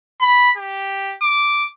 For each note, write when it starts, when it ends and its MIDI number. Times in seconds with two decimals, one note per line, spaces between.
0.21 0.50 83
0.57 1.15 67
1.22 1.66 86